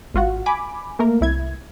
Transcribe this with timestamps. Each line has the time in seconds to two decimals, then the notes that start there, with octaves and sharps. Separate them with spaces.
0.14 G#1 F4 F#4 F#5
0.46 G#5 B5 D6
0.99 A3 A#3 A#4
1.21 C2 E4 G#6